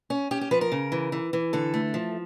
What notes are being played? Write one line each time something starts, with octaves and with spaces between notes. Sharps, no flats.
C#4
C#4 G4
G4
F3 B4
A#4
C#3
E3
E3
E3
D3 A4
A3
F3